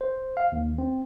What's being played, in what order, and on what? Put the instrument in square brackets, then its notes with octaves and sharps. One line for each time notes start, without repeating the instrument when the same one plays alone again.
[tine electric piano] C5
F5
D#2
C4